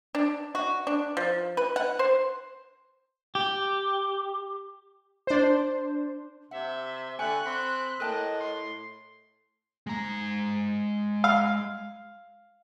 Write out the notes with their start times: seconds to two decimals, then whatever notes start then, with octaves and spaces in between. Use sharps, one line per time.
0.15 D4
0.55 F#4
0.87 D4
1.17 F3
1.57 B4
1.76 F#5
1.99 C5
3.35 G4
5.27 D4 C5
6.51 C3 E5 F#5
7.19 D3 E5 G5 G#5 C#6 F#6
7.46 C4 B5
8.00 A2 A#4 D#5 G5 A5
8.41 C6
9.87 G#3 A#5
11.24 F5